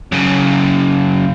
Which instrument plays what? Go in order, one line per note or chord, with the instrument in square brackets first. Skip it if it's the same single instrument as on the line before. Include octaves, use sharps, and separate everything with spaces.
[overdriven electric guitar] F#2 C#3